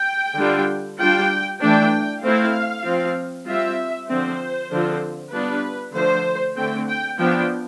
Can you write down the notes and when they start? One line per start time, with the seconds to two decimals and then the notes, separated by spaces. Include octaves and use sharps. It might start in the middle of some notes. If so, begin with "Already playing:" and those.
Already playing: G5
0.37 D3 G3 D4 F4
0.99 G3 D4 F4 G5
1.62 E3 A3 D4 G5
2.23 A3 C4 E4 F5
2.85 F3 C4 F4
3.47 G3 C4 F4 E5
4.09 D3 F3 C4 C5
4.71 D3 F3 C4 F4
5.32 G3 B3 D4 F4 B4
5.94 D3 F3 A3 C5
6.56 D3 A3 C4 G5
6.88 G5
7.18 F3 B3 D4 G5